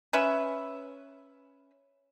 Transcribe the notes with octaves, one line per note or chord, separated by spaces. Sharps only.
C#4 B4 E5